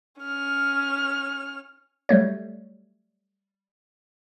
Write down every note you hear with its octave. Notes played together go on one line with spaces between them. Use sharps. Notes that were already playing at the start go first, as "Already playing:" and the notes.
C#4 F6
F#3 G3 A3 C#5